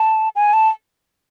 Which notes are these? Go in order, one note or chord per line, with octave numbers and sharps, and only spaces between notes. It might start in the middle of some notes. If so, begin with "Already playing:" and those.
Already playing: A5
G#5
A5